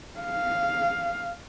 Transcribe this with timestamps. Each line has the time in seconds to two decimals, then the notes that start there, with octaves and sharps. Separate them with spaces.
0.20 F5